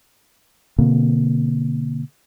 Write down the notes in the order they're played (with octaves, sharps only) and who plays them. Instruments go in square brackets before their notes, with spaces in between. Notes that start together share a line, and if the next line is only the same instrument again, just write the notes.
[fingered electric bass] B2 D3 A#3 C4